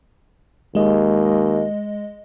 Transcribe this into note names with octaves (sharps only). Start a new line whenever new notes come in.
D#2 G#3 D#5